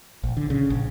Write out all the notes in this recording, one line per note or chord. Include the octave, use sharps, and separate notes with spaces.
A#1
D3
C#3
A#1